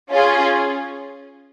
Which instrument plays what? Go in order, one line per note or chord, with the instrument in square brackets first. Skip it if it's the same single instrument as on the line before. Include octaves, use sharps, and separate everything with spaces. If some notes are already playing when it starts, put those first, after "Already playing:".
[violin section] C#4 F4 G#4